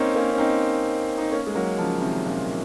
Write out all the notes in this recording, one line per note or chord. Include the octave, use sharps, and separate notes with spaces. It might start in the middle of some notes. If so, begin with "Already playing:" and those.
Already playing: A#3 C4 C#4 D#4
A#3 C#4
C#4
C4 D#4
D#4
A#3 C#4
G#3
F#3 A#3
C#3 F3
C3 D#3
A#2 C#3